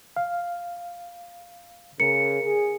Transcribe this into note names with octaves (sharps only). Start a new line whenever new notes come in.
F5
C#3 A#4 C#7
G#4